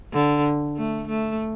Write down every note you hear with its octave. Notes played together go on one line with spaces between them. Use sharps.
D3
A3
A3